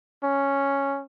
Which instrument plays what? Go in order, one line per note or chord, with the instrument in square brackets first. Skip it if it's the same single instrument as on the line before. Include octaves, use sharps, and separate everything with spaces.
[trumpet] C#4